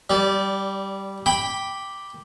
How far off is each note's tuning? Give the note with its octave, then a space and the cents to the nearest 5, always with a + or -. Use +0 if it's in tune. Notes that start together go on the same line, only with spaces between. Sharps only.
G3 -5 D5 -25
G5 +0 B5 -5 D6 +0